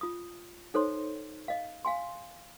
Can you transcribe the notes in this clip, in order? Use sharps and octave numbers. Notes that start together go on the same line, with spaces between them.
F4 D#6
D#4 A4 C5 C#5 C6
D#5 F5
F5 G#5 C6